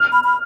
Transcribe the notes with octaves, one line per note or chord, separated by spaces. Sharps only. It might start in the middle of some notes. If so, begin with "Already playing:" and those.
Already playing: F6
B5
B5